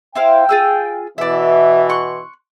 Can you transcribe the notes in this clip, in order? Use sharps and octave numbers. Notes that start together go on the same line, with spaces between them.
E4 C5 F5 G5
F4 G#4 E6
B2 E3 D5 E5
C6 C#6 F#6